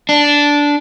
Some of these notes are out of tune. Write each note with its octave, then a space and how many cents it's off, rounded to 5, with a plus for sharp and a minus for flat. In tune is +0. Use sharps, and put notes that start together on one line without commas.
D4 -10